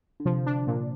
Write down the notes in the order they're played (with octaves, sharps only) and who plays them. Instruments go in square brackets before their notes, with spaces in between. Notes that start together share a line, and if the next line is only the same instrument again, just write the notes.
[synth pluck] D3
[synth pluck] C3 [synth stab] F3
[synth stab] D4
A#2